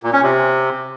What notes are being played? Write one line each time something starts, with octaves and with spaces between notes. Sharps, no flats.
A#2
C#4
C3